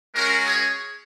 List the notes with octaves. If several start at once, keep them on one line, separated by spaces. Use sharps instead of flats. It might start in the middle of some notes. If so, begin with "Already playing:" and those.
G#3 C#4 F#4 A#4
G#4 C#5